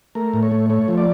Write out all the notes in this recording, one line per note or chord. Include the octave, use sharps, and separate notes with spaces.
A3 A#4
A2
C#5
A3
A3 C#5
F3
D5